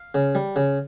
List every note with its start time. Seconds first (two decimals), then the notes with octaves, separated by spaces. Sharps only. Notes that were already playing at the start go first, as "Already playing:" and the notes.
Already playing: F5
0.15 C#3
0.35 G3
0.56 C#3